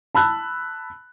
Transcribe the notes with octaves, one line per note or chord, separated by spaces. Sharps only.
A5 B5 E6 F#6